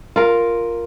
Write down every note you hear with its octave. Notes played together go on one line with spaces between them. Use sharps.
F4 A#4 F5